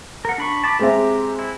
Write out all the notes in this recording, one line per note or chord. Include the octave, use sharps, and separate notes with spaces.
A#4 F#5
D4 B5 C#6
A5 B5 D6
G#3 C4 G4 E5 A#5
E4